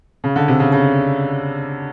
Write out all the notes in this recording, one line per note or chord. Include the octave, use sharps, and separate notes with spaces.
C#3
D3
C3
C#3
C#3